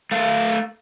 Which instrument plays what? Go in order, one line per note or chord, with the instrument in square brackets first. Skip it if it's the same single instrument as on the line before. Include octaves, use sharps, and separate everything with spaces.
[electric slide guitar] A3 F5